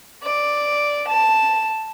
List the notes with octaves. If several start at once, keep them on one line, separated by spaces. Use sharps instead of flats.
D5
A5